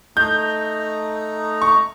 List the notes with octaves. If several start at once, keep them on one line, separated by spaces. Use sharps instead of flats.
A3 D#4 A#5 G6
C#6